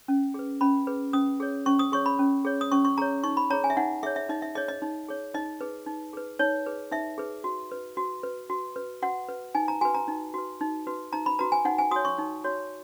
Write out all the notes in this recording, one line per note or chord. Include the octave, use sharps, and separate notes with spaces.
C#4
G#4 B4
C#4 B5
G#4 B4
C#4 D#6
G#4 C#5
C#4 C#6
D#6
G#4 C#5 C#6
B5
C#4
G#4 C#5
D#6
C#4 C#6
C#6
G#4 C#5 A#5
D#4 C#6
B5
G#4 C#5 A#5
G#5
E5
D#4 F#5
G#4 C#5 E5
E5
D#4 D#5
E5
G#4 C#5 D#5
D#5
D#4
G#4 C#5
D#4 D#5
G#4 B4
D#4
G#4 B4
D#4 C#5
G#4 B4
D#4 E5
G#4 B4
F#4
B4
F#4
B4
F#4
B4
F#4 F#5
B4
D#4 G#5
A#5
F#4 B4 G#5
A#5
D#4
F#4 B4
D#4
F#4 B4
D#4 A#5
B5
F#4 B4 A#5
G#5
D#4 F#5
G#5
F#4 C#5 D#6
C#6
D#4
F#4 C#5